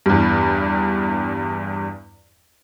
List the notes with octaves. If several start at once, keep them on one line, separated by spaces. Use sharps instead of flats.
E2 G2